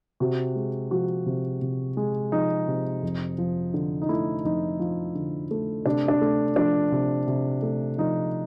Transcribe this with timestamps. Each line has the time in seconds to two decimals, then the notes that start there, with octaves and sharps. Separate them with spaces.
0.20 C3 F#4
0.56 G#3
0.91 F3 F#4
1.26 C3
1.61 C3
1.97 G#3
2.32 F3 D#4
2.68 C3
3.03 F2
3.38 F3
3.74 D3
4.02 D#4
4.09 A3 E4
4.45 F2 D#4
4.80 F3
5.15 D3
5.51 A3
5.85 C3 D4
6.08 D4
6.21 A3
6.56 F3 D4
6.92 C3
7.27 C3
7.62 A3
7.98 F3 D#4